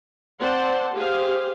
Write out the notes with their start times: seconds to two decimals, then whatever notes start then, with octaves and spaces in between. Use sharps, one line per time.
0.40 C4 C5 D5 F#5 A5 C6
0.93 G4 G#4 C5 F5